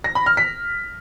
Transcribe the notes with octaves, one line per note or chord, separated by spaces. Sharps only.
A#6
B5
F6
B6